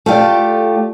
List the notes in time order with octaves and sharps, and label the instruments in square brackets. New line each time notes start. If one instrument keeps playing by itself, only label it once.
[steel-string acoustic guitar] A3 F4 G4 D5